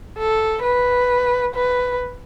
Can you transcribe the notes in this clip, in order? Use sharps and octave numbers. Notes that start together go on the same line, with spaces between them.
A4
B4
B4